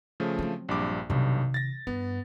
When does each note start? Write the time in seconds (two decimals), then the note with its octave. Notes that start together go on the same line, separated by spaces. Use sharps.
0.20 C#3 F3 A3
0.39 F#3 C4
0.69 A#1 G2 D6
1.10 B1 G2 C3 D#3
1.54 A6 A#6
1.87 G2 B3